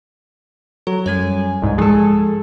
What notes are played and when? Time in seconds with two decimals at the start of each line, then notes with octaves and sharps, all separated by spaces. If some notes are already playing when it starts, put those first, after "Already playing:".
0.87 F#3 A4
1.06 F#2 G3 C#5 G#5
1.62 C2 G#2
1.78 F3 G#3 G#4 A4